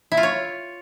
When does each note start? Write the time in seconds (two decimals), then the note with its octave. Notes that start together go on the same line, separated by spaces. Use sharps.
0.12 E4
0.17 F4
0.23 C#5